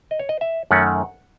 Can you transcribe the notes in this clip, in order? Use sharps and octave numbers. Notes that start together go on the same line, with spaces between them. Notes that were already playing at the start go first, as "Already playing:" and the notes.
D#5
C#5
D#5
E5
F#2 D#3 A3 C#4 F#5